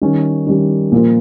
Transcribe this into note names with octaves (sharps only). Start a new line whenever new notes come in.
D#3 G3 C#4
D#3 G3 C#4
A#2 F3 A#3 F4